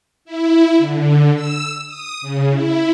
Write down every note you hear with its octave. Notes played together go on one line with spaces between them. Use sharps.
E4
D3
E6
D#6
C#3
E4